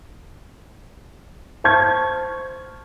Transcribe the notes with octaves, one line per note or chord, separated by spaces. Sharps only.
C5 A5 C#6 F6 G#6